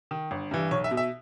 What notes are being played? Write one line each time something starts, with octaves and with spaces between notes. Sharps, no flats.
D#3
G1
G2 E3
B1 C#5
E5
B2
E5